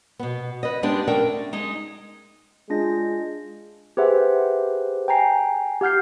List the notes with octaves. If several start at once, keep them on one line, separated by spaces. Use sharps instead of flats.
B2 B3
B4 D#5
G#3 B3 D4 G4
A3 D4 A#4 G5
G#3 D#4
G#3 D4 F4 A#6
G4 G#4 B4 C5 E5 F#5
G5 G#5 A#5 C7
G4 F#5 F6 G6 C7